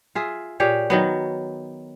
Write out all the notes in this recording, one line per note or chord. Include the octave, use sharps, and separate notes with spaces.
F4 G#4 E5
A#2 G4 G#4 C#5
D#3 F#3 B3